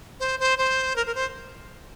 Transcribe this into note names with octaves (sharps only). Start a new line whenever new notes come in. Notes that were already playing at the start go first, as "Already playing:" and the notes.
C5
C5
C5
A#4
A#4
C5